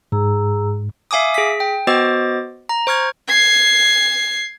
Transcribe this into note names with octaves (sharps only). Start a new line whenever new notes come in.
G#2 G#4 A#5 E6
E5 F5 G#5 D6 D#6
G#4 B6
G5
B3 F#4 C5 D#5 D6 A6
A#5
C5 C#6 F6 G#6
G#6 C7